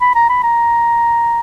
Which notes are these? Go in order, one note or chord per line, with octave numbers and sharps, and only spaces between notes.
B5
A#5
B5
A#5